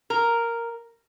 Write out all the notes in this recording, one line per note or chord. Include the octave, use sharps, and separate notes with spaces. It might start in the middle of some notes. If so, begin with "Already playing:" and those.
A#4